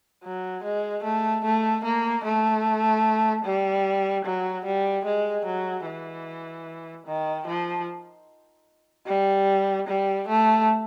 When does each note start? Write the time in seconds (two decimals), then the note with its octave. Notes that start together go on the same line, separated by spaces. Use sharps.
0.24 F#3
0.64 G#3
1.04 A3
1.44 A3
1.84 A#3
2.24 A3
3.45 G3
4.25 F#3
4.65 G3
5.05 G#3
5.46 F#3
5.86 E3
7.06 D#3
7.47 F3
9.07 G3
9.88 G3
10.28 A3